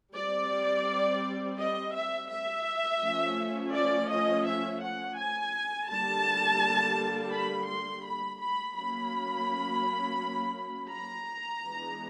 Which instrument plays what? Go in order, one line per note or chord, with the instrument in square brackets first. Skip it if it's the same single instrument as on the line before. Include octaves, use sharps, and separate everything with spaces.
[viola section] G3 C4 D5
D#5
E5
E5
F3 A3 C#4
D5
D#5
E5
F#5
G#5
D3 G3 A#3 A5
B5
C6
B5
B5
F#3 A#3 C#4 B5
A#5
E3 G#3 B3 D4